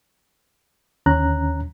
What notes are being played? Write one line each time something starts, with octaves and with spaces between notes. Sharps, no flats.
D#2 D3 C#4 A#5 F#6